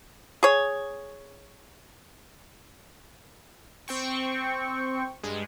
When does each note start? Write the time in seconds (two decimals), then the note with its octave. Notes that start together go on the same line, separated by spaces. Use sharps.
0.43 G#4 C#5
3.88 C4 G5 C#6
5.23 G2 G#3